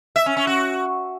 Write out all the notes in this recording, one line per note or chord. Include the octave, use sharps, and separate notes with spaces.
E5
C#4
C#4
F#4